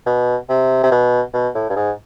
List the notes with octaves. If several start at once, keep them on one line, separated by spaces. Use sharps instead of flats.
B2
C3
C3
B2
B2
A2
G2
G#2